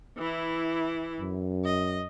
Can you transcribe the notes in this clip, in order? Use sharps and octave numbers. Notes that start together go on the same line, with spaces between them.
E3 E4
F#2
D#5